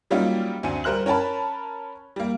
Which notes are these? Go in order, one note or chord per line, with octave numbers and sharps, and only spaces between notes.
F#3 G3 A#3 C#4 D#4 F4
D2 C4 D4 G#5 C#7 D#7
G3 A#4 C5 F#6 F#7
C#4 A#4 C#5 A5 B5
G3 A#3